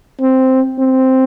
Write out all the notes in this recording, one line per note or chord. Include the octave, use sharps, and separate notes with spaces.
C4
C4